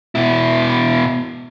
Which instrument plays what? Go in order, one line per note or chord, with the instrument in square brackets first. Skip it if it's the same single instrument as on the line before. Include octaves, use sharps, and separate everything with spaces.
[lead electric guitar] B2 E4